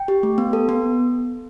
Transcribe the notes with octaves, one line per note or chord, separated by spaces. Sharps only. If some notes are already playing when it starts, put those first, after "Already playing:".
Already playing: G5
G4
A3
B3
A4
B3